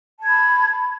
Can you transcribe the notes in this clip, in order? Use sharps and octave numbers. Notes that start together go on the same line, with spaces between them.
A5 B5 G#6